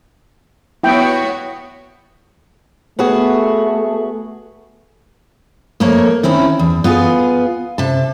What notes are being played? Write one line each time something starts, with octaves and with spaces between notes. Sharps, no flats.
B3 E4 F#4 C#5 G5
A3 B3 F#4 G#4
F2 A3 A#3 A#4 C#5
D#3 C4 C#4 E4
E2
B3 F4 G#4
C3 A5